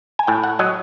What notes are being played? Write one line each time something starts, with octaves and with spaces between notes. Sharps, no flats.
G#5
A2 G5
F#5
F#3 D#5